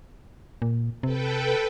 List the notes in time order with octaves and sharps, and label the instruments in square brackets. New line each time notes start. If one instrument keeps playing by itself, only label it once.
[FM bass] A#2
[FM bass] C3 [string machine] A4 B4 G5